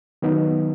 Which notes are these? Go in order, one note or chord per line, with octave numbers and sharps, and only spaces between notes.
D#3 F#3 B3 D#4